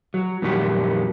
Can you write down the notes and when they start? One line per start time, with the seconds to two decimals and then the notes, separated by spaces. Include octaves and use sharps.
0.14 F#3
0.42 F2 A#2 D#3 F#3 G3